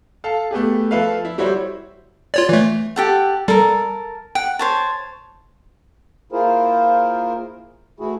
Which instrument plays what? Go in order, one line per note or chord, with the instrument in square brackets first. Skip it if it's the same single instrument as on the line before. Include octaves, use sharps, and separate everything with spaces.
[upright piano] A4 F5 A5
A3 B3 G4 G#4
F3 A4 B4 E5 F5
E4
G3 E4 F#4 C5 C#5
[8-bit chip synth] F4 C#5 D5
E3 A3
[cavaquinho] G4 A4 F#5
[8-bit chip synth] G3 [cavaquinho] A4 A#4
[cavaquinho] F#5 [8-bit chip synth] G5
[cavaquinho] C5 C#5 A5
[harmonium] A#3 E4 F4 G#4 A#4 C5
E3 A3 E4 F#4 G#4